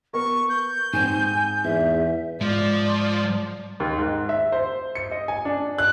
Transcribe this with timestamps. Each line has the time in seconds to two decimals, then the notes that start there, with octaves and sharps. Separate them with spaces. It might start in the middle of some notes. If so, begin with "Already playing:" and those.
0.13 B3 A#4 C#6
0.49 G6
0.93 G#2 C4 G#5
1.64 E2 E5
2.41 G#2 F3 G#3 D5
3.80 D#2
3.98 G#2
4.29 E5
4.52 C5
4.95 C#7
5.11 D#5
5.28 G#5
5.45 D4
5.78 F#6